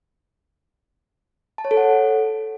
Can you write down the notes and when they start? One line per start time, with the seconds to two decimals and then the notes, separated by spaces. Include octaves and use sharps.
1.58 A5
1.65 C#5
1.71 A4
1.77 F#5